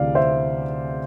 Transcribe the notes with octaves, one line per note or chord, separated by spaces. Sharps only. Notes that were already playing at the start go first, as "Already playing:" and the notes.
Already playing: D2 C3 E3 D5 F5
C5 E5